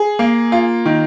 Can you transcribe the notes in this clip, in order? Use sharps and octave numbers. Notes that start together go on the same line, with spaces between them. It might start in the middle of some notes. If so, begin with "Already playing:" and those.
Already playing: G#4
A#3
F4
D#3